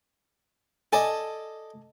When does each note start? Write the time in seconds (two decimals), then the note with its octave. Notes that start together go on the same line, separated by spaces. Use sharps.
0.93 A4 D5 D#5 G#5 A5